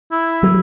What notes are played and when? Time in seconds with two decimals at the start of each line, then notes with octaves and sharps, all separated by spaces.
0.12 E4
0.43 F#3